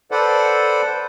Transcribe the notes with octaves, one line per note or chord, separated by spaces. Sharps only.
A4 B4 C5 D5 F#5